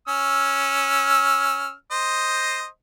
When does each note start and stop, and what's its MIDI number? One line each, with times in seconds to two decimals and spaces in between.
0.08 1.73 61
0.08 1.73 88
0.08 1.73 89
1.91 2.66 72
1.91 2.66 75